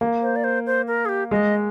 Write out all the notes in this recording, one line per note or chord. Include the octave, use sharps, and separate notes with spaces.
A#3
C5
D5
C5
C5
A#4
G#4
G4
G#3 D#5